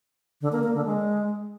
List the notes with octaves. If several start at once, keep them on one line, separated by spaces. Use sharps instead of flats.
D3
A#3
A#3
D3
G#3